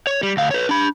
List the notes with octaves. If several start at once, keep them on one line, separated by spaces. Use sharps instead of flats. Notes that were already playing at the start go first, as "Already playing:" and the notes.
C#5
G3
D2 F5
B4 C#5
D4 B5